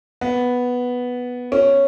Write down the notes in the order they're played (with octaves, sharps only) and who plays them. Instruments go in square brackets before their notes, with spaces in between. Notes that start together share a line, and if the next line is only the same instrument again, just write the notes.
[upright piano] B3
C#4